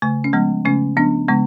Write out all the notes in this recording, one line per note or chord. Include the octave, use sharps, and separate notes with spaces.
C#3 A3
C#4
F3 G#3 B3
C#3 A3 C#4
F3 B3 D4
C#3 G#3 B3